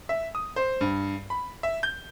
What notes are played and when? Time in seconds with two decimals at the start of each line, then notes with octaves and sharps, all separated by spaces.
0.09 E5
0.35 D#6
0.56 C5
0.81 G2
1.30 B5
1.63 E5
1.83 G6